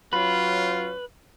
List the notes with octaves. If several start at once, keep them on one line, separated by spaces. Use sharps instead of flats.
F#3 C#4 F4 B4